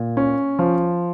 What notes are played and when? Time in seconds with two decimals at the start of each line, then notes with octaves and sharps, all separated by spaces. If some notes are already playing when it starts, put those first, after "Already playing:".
Already playing: A#2
0.17 C#4
0.59 F3